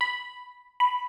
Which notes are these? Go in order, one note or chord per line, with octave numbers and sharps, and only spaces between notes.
B5
B5